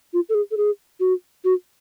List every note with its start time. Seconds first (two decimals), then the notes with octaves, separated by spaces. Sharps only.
0.13 F4
0.29 A4
0.34 G#4
0.51 A4
0.57 G#4
1.00 F#4
1.44 F#4